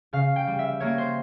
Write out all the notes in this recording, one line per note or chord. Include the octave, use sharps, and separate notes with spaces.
C#3 F5
G5
G3
E5
A#3 C#5
C5